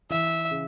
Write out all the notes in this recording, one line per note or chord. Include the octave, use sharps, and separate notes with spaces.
E3 E5
C#3